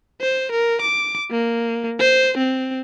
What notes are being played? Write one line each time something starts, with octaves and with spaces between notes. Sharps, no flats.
C5
A#4
D6
A#3
C5
C4